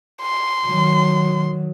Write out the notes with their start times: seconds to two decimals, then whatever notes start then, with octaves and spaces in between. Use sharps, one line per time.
0.22 C6
0.67 D#3 F#3